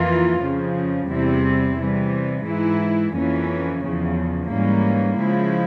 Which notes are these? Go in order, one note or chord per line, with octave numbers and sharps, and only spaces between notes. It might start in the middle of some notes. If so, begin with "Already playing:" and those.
Already playing: F2 E3 A#3 F4
F2 C#3 F3
E2 C3 G3 C4 E4
C3 E3 G3
G#2 E3 G#3 E4
F2 E3 A#3 C#4
E2 C#3 F3
G#2 E3 G3 A#3 C#4
C#3 F3 G#3 E4